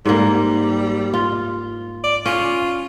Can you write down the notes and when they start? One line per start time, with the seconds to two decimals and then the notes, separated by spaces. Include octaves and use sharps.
0.05 G#2 G3 A#3
1.14 F4
2.04 D5
2.26 C#4 F4